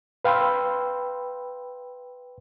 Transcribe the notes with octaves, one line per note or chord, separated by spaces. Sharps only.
B4 F5 G5 B5 C6 E6